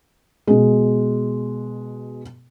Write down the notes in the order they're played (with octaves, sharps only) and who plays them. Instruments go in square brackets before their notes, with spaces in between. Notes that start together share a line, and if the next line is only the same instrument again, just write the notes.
[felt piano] B2 G#3